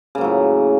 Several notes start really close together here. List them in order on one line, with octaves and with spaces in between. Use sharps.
C#3 A#3 F#3 A2